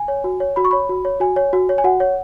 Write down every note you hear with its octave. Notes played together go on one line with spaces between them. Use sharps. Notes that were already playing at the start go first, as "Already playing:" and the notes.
Already playing: G#5
C#5
F#4
C#5
F#4 B5
C#6
C#5 B5
F#4
C#5
F#4 G#5
C#5
F#4
C#5
G#5
F#4 F#5
C#5